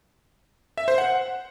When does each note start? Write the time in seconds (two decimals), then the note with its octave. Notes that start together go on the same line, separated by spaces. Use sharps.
0.78 E5
0.88 C5
0.98 F#5